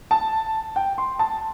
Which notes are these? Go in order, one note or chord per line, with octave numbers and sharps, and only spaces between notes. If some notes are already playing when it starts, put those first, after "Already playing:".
A5
G5
C6
A5